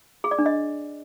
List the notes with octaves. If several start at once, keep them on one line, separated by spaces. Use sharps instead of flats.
G#4
D5
D4
D#5